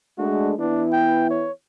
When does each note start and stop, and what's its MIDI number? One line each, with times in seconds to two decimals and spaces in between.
0.18 0.54 56
0.18 0.54 57
0.18 0.54 62
0.18 0.50 66
0.59 1.47 52
0.59 1.47 59
0.59 0.86 62
0.59 1.47 64
0.93 1.25 79
1.30 1.52 73